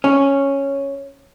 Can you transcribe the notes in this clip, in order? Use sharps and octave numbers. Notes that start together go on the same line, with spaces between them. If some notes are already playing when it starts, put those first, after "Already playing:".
C#4